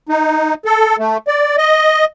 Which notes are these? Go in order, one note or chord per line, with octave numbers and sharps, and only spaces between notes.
D#4
A4
A3
D5
D#5